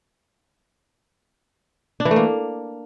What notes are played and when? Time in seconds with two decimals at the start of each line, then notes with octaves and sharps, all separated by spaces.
2.00 D4
2.05 E3
2.11 A3
2.16 A#3